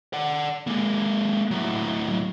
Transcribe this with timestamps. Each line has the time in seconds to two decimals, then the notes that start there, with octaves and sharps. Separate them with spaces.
0.13 D5 F#5
0.67 G#3 A#3
1.51 A2 F#3